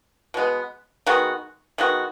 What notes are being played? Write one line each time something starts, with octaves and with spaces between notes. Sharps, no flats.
B2 G#3 B3
D#3 G#3 B3 F#4
D#3 G#3 B3 F#4